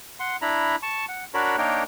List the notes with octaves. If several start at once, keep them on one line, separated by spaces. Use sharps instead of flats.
F#5 C6
D4 E4 A#5 B5
A5 C#6
F#5
D4 F#4 A#4 C#5 B5
A#3 D4 D#4 A#4 C#5 G5